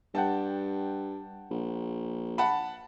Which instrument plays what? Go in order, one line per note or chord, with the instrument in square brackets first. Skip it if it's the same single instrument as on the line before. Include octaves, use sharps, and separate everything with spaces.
[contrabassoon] G2 [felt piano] F#5 G5 A5
[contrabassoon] A#1
[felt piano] F#5 A5 B5